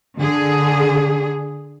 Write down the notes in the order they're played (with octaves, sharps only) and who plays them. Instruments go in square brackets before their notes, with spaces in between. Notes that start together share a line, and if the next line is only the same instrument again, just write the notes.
[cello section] D3 G#4